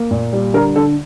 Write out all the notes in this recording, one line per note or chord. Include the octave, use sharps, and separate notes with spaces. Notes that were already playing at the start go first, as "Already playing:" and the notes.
Already playing: A#3
A#2
G3
D3 A#4
D3 A4